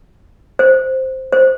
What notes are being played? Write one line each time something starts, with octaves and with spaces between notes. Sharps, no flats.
C5
C5